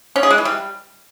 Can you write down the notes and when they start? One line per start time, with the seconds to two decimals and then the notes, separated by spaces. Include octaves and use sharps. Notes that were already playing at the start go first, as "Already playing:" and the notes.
0.16 C#4
0.23 G#4
0.30 G#3
0.38 E3
0.45 G3